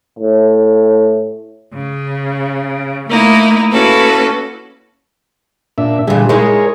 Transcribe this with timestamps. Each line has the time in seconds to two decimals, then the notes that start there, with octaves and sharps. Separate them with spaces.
0.19 A2
1.75 C#3
3.09 A3 A#3 D#4 E4
3.72 A#3 C#4 E4 F#4 A4 B4
5.78 A#2 D4 E5
6.07 A#2 D3 E3 G3 G#4
6.29 G#3 D#4 E4 G#4 A#4 C#5